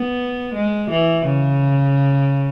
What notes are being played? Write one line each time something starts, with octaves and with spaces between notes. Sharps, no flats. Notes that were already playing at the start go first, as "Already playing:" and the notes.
Already playing: B3
G#3
E3
C#3